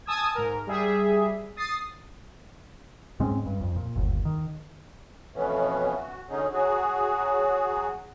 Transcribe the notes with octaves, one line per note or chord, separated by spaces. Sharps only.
G#5 A5 D#6 E6 G#6
G#2 A#4
G3 G#4 E5
D#6 A6 C7
G#2 G#3 C4 C#4
G2
F2
A#2
G1 D#2
D#3
F2 B2 E3 A3 B3 C#4
F#4
D3 F#3 C#4 D#4 G#4
F#3 F#4 G#4